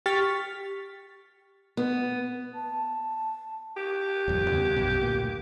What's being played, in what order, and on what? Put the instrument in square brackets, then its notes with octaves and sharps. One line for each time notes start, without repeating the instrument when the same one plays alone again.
[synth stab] G4 C#6 F6 A6 B6
[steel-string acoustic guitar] B3
[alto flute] A5
[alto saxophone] G4
[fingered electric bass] D1 F2 G3
E2 C#3 B3
A#1 F#2 B2
D2 A#2 A#3